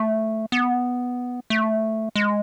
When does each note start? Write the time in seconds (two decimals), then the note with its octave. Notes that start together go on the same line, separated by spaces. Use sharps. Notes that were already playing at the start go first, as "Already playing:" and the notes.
Already playing: A3
0.52 B3
1.50 A3
2.16 G#3